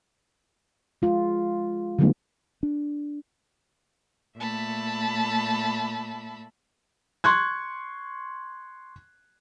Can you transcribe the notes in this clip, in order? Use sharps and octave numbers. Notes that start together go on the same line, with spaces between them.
G#3 F4
D3 F#3 G3 A3 B3 D#4
D4
A#2 A3 E5 A5 B5
C6 C#6 F#6 G#6